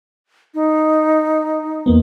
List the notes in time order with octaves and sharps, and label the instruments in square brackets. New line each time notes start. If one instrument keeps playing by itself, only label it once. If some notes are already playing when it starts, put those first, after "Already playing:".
[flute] D#4
[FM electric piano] E2 A#3 B3